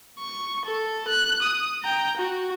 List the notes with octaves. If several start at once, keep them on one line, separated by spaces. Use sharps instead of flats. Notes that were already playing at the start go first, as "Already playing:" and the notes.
C#6
A4
F#6
D#6
G5 A#5
F#4